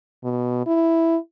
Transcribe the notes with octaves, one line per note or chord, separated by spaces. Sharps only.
B2
E4